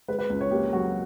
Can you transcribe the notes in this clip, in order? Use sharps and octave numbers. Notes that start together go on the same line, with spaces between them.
G#3 B4
B4
C#2
C#5
A#3 G4
F#3 F#4